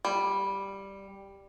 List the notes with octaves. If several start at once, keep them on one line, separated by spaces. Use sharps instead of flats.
G3